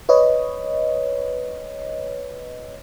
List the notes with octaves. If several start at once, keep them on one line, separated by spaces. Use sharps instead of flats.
B4 C#5 D#5